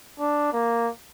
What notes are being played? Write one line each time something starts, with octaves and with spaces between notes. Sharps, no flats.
D4
A#3